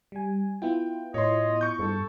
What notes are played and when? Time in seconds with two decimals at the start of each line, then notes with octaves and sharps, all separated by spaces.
0.12 G3 G#5
0.62 B3 E4 F4 G5
1.14 A2 C#5 D#5 C6
1.61 C#6 G6
1.79 G2 A4